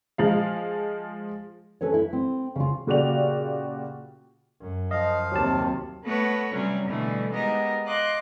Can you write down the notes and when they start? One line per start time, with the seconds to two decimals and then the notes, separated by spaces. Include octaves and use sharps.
0.18 F3 G#3 F5
1.81 C#4 A4 B4 C#5
1.94 E4
2.13 C4
2.56 C#3 F4
2.87 A#2 C#3 F#4 G4 D5 F7
4.61 F#2
4.91 F3 D#5 F5
5.32 D#2 C3 F#3 G4 A5
6.05 A3 B3 F#4 A4 B4 C#5
6.53 C3 F#3 G3 C4 C#4
6.87 B2 D3 E3 G3 A3
7.31 G#3 B3 D#4 G4 A#4 D#5
7.86 D#5 F5 C6 D6 F#6